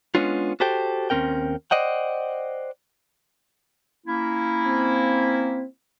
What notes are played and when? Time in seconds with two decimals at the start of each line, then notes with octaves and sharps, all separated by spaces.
0.15 G#3 B3 C#4 D4 F4
0.60 F#4 G4 A4 C5 G5
1.10 D#2 C#3 C4 C#4 A#4 G5
1.71 C5 D5 D#5 F#5 G5
4.06 A#3 C#4 E4
4.67 C4